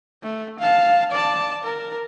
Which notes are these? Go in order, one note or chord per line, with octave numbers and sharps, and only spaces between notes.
A3
F5 A5
D5 A5
A#4